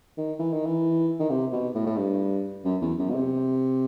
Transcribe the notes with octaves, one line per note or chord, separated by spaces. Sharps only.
D#3
E3
D#3
E3
D#3
C3
B2
A2
A2
G2
F#2
E2
F#2
B2
C3